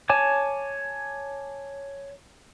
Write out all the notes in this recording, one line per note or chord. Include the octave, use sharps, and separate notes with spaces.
C#5 G#5 A5 D6